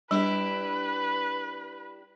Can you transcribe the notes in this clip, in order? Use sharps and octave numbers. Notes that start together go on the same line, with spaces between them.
G3 D4 E4 G4 B4